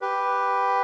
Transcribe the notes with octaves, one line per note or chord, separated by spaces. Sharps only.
G4 B4